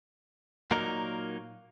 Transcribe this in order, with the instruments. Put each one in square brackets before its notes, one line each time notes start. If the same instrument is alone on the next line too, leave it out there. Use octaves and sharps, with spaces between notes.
[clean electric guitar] A#2 F#3 A#3 D#4 A#4